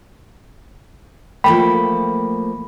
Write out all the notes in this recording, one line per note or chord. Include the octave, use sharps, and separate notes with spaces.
F3 A3 A#3 G5 B5